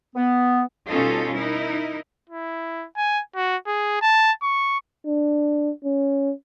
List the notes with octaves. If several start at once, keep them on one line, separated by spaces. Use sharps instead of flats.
B3
B2 G3 C#4 D#4 F4 A4
D#4 E4 A#4
E4
G#5
F#4
G#4
A5
C#6
D4
C#4